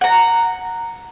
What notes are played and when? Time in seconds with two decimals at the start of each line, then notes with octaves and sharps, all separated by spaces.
0.01 F#5 A#5